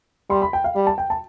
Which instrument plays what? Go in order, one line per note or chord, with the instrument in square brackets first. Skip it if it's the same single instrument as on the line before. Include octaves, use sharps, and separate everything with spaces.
[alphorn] G3 [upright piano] C6
[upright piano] B5
G5
F5
[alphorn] G3
[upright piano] A5
G5
A5